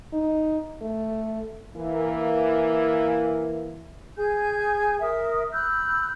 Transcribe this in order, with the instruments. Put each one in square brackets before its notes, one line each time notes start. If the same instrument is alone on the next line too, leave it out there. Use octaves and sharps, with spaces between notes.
[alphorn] D#4
A3
[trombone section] E3 A#3
[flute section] G#4 G#5 G6
A#4 E5 D#6
B5 E6 F#6 G6